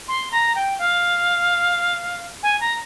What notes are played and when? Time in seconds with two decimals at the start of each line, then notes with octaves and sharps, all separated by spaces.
0.08 C6
0.31 A#5
0.55 G5
0.79 F5
2.43 G#5
2.60 A#5